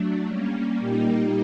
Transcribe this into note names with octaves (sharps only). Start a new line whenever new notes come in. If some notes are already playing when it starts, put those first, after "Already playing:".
Already playing: F#3 A3 D4
G3 A#3 C#4
A#2 G3 A#3 D#4 G4